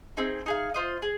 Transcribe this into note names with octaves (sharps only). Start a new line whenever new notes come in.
C4 D#4 G#4
D#4 G#4 F5
F4 C5 D#5
G#4